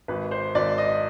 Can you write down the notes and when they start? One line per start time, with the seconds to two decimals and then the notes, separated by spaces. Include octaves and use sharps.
0.08 G#1 B4
0.31 C5
0.55 G#1 D5
0.78 D#5